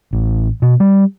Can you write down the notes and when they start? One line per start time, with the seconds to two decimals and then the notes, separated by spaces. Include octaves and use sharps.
0.13 A1
0.62 B2
0.80 G3